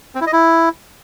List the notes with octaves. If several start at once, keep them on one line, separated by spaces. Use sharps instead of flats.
C4
E4
D#5
E4